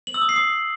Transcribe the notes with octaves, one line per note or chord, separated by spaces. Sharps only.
F#7
E6
D#6
C7
D#6